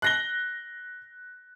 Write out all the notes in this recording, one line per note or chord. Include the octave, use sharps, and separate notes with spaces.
F#6 A#6 G7